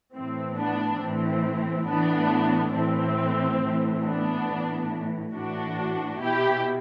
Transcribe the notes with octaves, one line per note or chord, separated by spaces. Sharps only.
A2 E3 C4
B3 D4
A2 E3 C4
A2 E3 B3 D4
A2 E3 C4
A2 E3
B3 D4
A2 E3
A2 E3 D4 F#4
B2 E4 G4